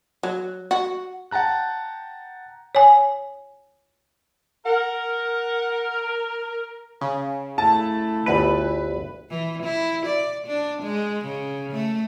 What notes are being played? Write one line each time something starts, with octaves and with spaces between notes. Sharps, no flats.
F#3
F#4
F#5 G5 A5 A#5 F#6
C#5 G#5
A#4 F#5
C#3 C#4 G#5
A3 E4 A5
G1 D2 B4 D#5
E3
E4
D5
D4
G#3
C#3
A3